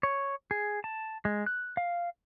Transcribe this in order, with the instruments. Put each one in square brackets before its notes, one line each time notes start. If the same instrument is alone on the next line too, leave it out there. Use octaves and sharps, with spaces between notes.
[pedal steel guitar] C#5
G#4
A5
G#3
F#6
F5